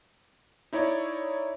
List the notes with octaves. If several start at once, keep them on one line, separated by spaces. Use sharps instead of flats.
D#4 E4 C#5 D5